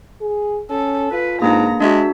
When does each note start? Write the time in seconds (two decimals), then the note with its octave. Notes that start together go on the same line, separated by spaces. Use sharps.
0.21 G#4
0.70 C#4 A4
1.12 F4 B4
1.42 G#2 A#3 D4 G#4 A#5
1.80 G#3 D4 F#4 G#4 E5